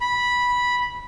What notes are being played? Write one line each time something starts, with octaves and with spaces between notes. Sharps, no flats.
B5